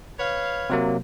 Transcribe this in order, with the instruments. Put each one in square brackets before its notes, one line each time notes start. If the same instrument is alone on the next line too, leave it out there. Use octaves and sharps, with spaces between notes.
[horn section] B4 C#5 F5
[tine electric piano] C3 F#3 A#3